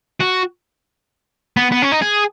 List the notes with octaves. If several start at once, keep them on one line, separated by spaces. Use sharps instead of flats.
F#4
B3
B3
C#4
D#4
G#4